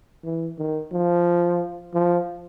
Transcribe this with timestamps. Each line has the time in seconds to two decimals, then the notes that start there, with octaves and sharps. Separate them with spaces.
0.24 E3
0.58 D#3
0.92 F3
1.94 F3